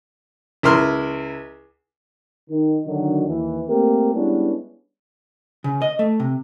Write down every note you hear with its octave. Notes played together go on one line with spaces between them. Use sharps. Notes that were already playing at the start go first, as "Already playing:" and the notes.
C#2 E4 A#4 C6 F6
D#3
D3 D#3 F#3
D#2 E3
A3 A#3 C4 G4 A#4
G3 G#3 B3 C#4 D4 E4
C#3
D#5
A3
C3